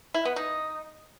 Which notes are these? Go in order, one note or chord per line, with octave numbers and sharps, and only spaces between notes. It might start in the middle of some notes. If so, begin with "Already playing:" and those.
E4
B3
D#4